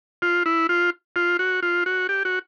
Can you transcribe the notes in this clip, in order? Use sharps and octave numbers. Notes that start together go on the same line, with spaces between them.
F4
E4
F4
F4
F#4
F4
F#4
G4
F#4